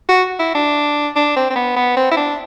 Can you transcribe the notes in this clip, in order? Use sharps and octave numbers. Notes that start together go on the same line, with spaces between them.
F#4
E4
D4
D4
C4
C4
B3
B3
C4
E4
D4